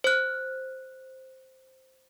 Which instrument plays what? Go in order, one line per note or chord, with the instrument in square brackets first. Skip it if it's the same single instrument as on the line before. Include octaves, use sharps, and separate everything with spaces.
[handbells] C5 F#6